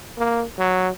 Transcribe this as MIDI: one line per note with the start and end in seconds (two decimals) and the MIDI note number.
0.17 0.45 58
0.59 0.90 54